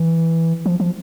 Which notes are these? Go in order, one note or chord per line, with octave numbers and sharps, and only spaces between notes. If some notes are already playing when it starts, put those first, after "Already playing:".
Already playing: E3
F3
F3